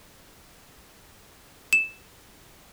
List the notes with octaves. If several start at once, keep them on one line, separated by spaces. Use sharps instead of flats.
E7